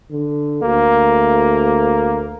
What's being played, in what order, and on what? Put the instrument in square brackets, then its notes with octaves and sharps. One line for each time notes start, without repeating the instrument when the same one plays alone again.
[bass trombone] D3
[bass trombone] D2 [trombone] A#3